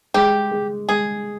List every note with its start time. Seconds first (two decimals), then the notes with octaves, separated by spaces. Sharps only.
0.14 G#3 G4
0.51 G#3
0.89 G#3 G#4